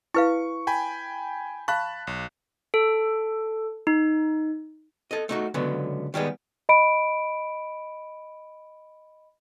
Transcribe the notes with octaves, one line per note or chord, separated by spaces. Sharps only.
E4 B4 F5 C#6
G5 G#5 B5
F5 A5 B5 C#6 F#6
B1
A4
D#4
A4 D#5
A3 D#4 F#4
C#2 D3 F#3 B3
D#3 G3 G#3 B3
D#5 B5 D7